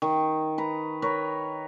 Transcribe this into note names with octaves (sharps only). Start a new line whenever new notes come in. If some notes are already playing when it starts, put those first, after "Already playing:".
D#3
B4 A#5
A#4 B4 C#5